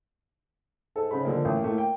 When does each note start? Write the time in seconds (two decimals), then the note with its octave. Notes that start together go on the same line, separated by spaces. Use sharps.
0.96 G#2 A4
1.11 G#2 C#3 B5
1.25 D3 F3 A#3
1.45 A1 A#3
1.64 A2 A3
1.78 G5